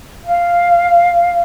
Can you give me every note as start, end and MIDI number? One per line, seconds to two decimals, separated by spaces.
0.24 1.42 77